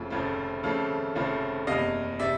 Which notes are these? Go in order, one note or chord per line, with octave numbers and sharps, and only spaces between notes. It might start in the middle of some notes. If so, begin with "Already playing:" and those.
Already playing: F1 F2 C#3 F3 A3
F1 F2 C#3 F3 A3
F1 F2 C#3 F3 A3
F1 F2 C#3 F3 A3
F#1 E2 C3 D#5 F5
C3 D5 E5